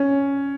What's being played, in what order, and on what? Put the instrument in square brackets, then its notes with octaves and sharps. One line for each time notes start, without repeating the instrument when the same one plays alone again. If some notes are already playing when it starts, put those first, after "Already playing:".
Already playing: [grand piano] C#4